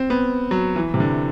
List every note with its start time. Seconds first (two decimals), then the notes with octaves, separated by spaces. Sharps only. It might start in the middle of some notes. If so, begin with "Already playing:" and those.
Already playing: C4
0.10 B3
0.51 F#3
0.76 E3
0.94 C3
1.00 D3